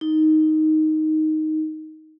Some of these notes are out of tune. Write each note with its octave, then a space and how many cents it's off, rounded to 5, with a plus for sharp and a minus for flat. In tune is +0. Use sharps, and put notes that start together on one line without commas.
D#4 +5